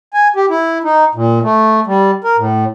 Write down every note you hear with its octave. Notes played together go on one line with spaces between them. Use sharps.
G#5
G4
E4
D#4
A#2
A3
G3
A#4
A2